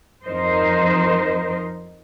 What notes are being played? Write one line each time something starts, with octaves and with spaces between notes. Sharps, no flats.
F2 D#4 A#4 C5 D#5